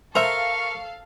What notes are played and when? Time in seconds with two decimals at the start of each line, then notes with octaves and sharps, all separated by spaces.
0.15 A4 A#4 C5 E5 F5 C#6